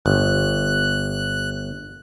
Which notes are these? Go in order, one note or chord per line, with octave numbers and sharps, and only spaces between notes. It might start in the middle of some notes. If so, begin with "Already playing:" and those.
G1 F#6